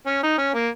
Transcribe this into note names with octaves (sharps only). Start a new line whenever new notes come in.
C#4
D#4
C#4
A#3